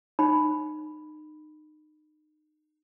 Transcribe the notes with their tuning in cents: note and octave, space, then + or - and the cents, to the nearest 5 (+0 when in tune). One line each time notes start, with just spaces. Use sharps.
D#4 -30 B5 +0